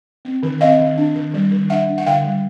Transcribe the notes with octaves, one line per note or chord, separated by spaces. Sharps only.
C4
D#3
C4 D#5 F5
D#3
D4
D#3
G3
D#3
D4 E5 F#5
D4
F#5
D3 F5 G5
G3